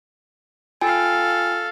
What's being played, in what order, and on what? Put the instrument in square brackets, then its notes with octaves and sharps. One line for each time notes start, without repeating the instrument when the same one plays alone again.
[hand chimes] F4 G5 G#5 [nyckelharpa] A4 F5